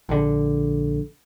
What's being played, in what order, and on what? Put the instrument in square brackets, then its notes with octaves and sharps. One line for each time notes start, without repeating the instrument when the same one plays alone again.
[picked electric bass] A#1 D3